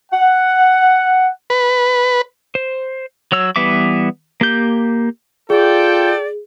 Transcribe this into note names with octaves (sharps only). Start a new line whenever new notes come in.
F#5
B4
C5
F#3 C#5 E6
E3 G3 B3 E5 D6
A#3 G4 G6
F4 G#4 A4 D5 G5